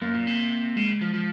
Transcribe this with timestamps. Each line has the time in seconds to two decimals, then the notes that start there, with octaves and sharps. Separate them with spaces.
0.01 F#2 A#3
0.14 A#2
0.27 C3
0.76 C#3 G#3
1.01 F3
1.14 F3